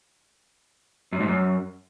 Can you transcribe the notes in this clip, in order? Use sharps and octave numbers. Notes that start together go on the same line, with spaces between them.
F#2
G#2
F#2